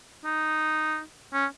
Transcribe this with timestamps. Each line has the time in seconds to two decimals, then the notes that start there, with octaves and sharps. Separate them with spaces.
0.25 D#4
1.33 C#4